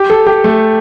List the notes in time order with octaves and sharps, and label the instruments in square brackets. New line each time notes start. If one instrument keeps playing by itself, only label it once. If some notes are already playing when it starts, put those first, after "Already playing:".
Already playing: [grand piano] G4
A4
G4
A3